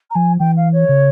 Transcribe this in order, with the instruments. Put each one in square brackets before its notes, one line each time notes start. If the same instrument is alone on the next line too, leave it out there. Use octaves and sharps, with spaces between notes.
[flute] A#5
[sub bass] F3 [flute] G#5
[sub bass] E3 [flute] G5
[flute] F5
C#5
[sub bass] C#3